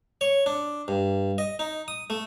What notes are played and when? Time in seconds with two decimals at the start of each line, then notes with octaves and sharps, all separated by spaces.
0.21 C#5
0.46 D4
0.88 G2
1.38 D#5
1.59 D#4
1.88 D#6
2.10 A3